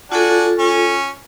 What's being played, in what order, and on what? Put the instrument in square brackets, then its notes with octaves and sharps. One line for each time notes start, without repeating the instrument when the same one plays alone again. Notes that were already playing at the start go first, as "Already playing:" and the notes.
[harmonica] D4 F#4 G#5 [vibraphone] F4 A4
[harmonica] C#4